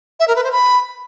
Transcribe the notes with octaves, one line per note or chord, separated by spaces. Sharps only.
E5
A#4
B4
C5
B5